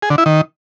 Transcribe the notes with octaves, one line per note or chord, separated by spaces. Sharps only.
G#4
D3
E4
D#3